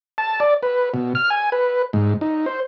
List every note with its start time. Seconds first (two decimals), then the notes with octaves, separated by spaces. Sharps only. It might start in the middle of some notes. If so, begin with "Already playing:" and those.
0.18 A5
0.40 D5
0.63 B4
0.94 B2
1.15 F6
1.30 G#5
1.52 B4
1.93 G#2
2.21 D#4
2.46 C5